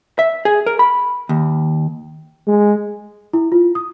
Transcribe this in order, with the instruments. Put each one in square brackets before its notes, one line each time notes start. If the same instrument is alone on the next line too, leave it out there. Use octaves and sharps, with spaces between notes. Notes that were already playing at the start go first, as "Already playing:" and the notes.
[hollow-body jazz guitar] E5
G#4
A#4
B5
D#2
[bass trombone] G#3
[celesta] E4
F4
D#6